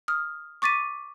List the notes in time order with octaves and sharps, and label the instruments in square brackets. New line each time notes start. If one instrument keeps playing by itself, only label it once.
[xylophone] D#6 F6
C#6 D6 A6 B6 D#7